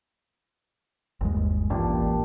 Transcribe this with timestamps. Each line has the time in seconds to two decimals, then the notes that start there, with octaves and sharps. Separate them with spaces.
1.21 G1 D#2 G#3
1.70 A1 A#2 D4 G4